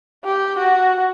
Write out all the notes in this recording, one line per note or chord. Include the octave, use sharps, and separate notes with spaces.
G4
F#4